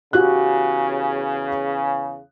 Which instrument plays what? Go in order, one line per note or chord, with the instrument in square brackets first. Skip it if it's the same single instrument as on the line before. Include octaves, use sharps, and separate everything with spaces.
[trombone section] E2 C#3 [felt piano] F#4 G4 F#6